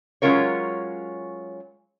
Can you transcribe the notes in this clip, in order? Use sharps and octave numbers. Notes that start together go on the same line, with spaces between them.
F#3 G#3 C#4 F4 A#4 C#5